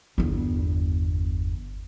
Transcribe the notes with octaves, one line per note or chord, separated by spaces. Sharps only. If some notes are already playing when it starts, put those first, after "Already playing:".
G1 E2